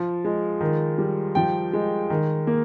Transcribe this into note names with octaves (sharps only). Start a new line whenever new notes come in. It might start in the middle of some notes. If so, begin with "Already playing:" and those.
Already playing: F3
G#3
D#3
G3
F3 G5
G#3
D#3
A#3